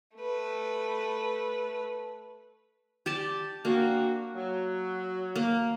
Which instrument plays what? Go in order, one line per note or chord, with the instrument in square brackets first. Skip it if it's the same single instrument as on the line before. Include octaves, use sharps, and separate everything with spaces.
[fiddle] A3 B4
[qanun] G4 D5 A5
[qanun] A#3 [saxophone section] C4 D4 F#4
[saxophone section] F#3
[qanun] A#3